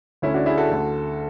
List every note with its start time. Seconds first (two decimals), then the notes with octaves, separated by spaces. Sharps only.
0.22 D2 D3 C#4 E4
0.34 D4 F#4
0.46 E4 G#4
0.58 F#4 A4
0.70 D2 D3